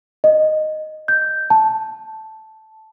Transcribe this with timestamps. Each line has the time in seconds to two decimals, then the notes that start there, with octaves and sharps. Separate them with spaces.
0.24 D#5
1.08 G6
1.50 A5